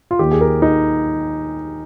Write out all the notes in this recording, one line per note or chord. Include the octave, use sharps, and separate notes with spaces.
F4
D#2 D#3 G4
G#4
A#4
D#4